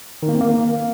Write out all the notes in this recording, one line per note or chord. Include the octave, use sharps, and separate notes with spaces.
D#3
A#3
C4
A#3